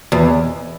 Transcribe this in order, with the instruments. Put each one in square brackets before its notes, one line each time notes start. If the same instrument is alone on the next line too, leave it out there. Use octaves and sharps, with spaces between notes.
[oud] E2